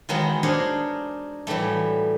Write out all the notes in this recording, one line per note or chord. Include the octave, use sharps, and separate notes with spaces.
D#3 E3 F#3 G#3 B3 D#4
D4 D#4 G#4 A#4 C5 C#5
A2 E3 F#3 G3 A3